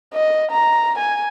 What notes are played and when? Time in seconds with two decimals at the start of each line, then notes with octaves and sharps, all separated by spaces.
0.13 D#5
0.51 A#5
0.99 G#5